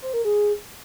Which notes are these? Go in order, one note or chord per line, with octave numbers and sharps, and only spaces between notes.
C5
A#4
G#4